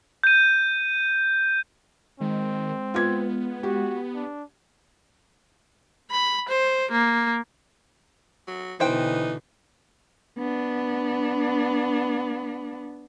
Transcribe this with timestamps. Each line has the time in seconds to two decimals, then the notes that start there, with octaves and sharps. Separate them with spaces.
0.23 G6 D#7
2.20 D#3 G#3 C4
2.94 B3 F4 G#6
3.63 F#4 G4
4.15 D4
6.11 B5
6.49 C5
6.91 A#3
8.47 F#3
8.80 B2 D3 E3 D#4 C5 G5
10.38 B3 D4